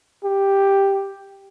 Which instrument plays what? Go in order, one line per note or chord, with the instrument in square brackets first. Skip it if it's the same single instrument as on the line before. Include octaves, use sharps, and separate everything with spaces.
[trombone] G4